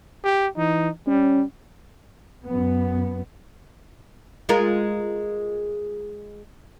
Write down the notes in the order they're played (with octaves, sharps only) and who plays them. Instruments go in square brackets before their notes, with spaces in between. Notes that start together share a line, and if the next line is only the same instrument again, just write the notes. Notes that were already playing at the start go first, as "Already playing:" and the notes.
[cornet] G4
[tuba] E3 [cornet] D#4
[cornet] G3 [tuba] C#4
[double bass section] F#2 B3
[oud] G#3 F4 A#4